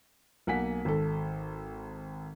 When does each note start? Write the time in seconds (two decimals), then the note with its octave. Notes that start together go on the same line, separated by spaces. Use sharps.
0.47 B1 A#3 F#5 G#5 B6
0.85 G#1 A4